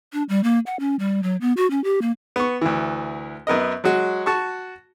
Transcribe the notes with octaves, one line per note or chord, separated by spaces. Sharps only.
D4
G3
A#3
F#5
C#4
G3
F#3
B3
F#4
C#4
G4
A#3
B3 C#6
D2 E3
F#2 B3 A#4 D#5
F#3 G#3 F#4
F#4 A5 C#6